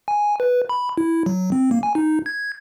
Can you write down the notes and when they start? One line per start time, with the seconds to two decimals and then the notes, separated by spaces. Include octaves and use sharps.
0.08 G#5
0.40 B4
0.69 B5
0.97 E4
1.26 F#3
1.52 C4
1.71 A#3
1.83 G#5
1.95 D#4
2.26 G#6